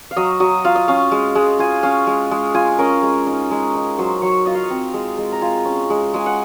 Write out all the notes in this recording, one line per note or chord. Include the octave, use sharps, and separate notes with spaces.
F5
F#3 D#5
F#3 D#5
F4 F5
D#5
C#4 F5
G#3
G#3
F4 G#5
C#4 F5
G#3
G#3
F4 G#5
C#4 A#4
G#3
D#4
G#3
D#4
F#3 C5
F#3 C#5
F4 D#5
F5
D#5
C4
G#3
G#3
A#5
F4 G#5
C#4
G#3
G#3 G#5
F#5